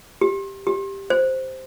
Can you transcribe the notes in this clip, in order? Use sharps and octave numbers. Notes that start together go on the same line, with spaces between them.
G4
G4
C5